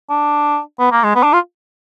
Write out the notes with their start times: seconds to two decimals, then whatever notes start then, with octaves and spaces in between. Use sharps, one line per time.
0.09 D4
0.79 B3
0.92 A#3
1.03 G#3
1.15 B3
1.23 D4
1.33 F4